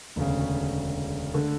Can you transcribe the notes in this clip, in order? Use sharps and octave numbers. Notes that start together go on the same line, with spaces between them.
E1 D2 C#3
D3 A3